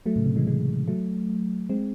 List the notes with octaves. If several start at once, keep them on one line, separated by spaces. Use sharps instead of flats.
F#3 A3
A2 C#3
C3
E3 G#3
E3 G#3
F#3 A3
G#3 C4